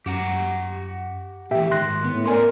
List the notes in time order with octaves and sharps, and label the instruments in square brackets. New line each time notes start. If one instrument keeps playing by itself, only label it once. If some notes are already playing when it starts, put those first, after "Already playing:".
[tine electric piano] F#2 [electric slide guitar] G4 F#5 A#5
[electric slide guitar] A#2 E3 [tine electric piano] G4 E5 G5
[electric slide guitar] G#2 D#3 [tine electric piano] C6 F#6 A#6
[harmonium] A2 [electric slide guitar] B3
[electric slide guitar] A3 B3 C#4 [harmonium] A#4 [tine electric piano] D5 G#5 C6